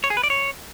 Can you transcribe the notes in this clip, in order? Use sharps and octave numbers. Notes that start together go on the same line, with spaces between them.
C#5
G#4
B4
D5
C#5